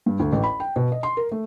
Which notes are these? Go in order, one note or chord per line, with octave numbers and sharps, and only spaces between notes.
G2
D2
A1
B5
G5
B2
D#5
C6
A#4
A3